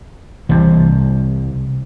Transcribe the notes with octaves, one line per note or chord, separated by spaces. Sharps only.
C2 C3 E3